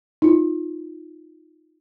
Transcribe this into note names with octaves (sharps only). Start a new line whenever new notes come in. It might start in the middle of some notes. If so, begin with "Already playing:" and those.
D#4 F4